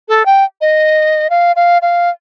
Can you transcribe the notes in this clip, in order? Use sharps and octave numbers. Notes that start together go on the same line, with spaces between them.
A4
G5
D#5
F5
F5
F5